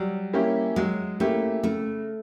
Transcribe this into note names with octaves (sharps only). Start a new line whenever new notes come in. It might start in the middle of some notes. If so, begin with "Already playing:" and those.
Already playing: F#3 G3
A#3 C#4 E4 G4
F#3 G#3
A3 A#3 C#4 E4 G4
C#3 A3